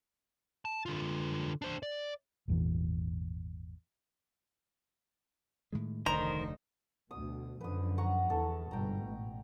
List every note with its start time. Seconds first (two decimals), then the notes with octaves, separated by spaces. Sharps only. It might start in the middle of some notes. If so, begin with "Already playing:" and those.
0.65 A5
0.86 D3 F4
1.62 D4 C5
1.83 D5
2.48 G#1 E2 A#2 E3
5.73 A2 D#3 G#3
6.06 F1 D2 D#3 D#4 A#4 C5 A#5
7.11 D2 B2 D#6
7.61 F#2 D3 F3 B4 D#6
7.98 F#5 A#5 C#6
8.30 E2 A4
8.71 G1 G#2 B2 G5 A#5
9.04 A1